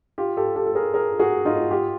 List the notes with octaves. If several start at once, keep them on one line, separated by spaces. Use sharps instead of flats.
F4 G4
G4 A4
G4 A4
A4
G#4 A#4
G#4 A#4
F#4 G#4
D#4 F4
F4 G4